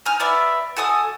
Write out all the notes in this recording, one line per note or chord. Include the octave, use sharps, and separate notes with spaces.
D#4 G#5 F6
B3 D5 E5
F#4 A4 G#5 D#6